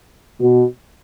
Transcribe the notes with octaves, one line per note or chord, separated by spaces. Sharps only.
B2